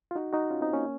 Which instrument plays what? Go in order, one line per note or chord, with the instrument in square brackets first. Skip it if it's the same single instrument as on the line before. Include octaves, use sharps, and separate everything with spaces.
[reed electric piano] F4
D#4 F#4
D#4 F#4
C#4 F4
C4 D#4
A#3 C#4